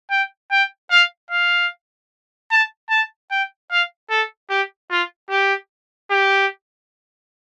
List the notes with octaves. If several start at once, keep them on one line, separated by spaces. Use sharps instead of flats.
G5
G5
F5
F5
A5
A5
G5
F5
A4
G4
F4
G4
G4